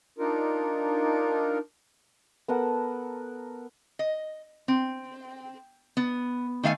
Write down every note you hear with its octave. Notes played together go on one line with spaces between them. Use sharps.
D4 D#4 F4 A#4
B3 A4 A#4 F#5
D#5
C4
B3
D#3 A3 F5 G#5